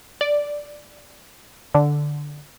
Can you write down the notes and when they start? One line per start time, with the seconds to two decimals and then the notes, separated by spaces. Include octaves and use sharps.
0.21 D5
1.75 D3